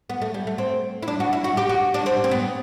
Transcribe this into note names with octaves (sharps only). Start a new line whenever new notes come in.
B3
A3
G3
A3
C4
E4
D4
F#4
E4
F#4
G4
F#4
D4
C4
C4
B3